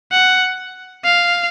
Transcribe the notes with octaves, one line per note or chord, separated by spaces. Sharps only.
F#5
F5